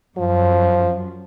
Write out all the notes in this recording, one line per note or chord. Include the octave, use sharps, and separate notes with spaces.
F#2 F3